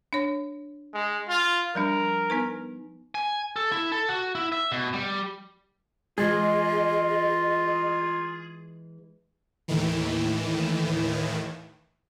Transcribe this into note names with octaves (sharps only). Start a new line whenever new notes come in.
D4 C#5
G#3
F4
F3 G3 D4 A#4
B3 D#4 B4
G#5
A4
E4
A4
F#4
E4
E5
B2
G3
E3 G#3 F4 G#4 D#5
D#2 A2 D#3 E3